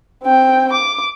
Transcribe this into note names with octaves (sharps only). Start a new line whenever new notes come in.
C4 G5
D6